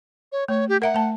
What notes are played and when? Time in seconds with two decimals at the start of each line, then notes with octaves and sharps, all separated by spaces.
0.32 C#5
0.48 A3 C#5
0.69 G4
0.82 A#4 E5 F#5 A#5
0.94 A3 A5